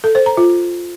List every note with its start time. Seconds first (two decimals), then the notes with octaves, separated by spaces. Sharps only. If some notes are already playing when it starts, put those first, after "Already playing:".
0.04 A4
0.15 C5
0.26 A#5
0.37 F4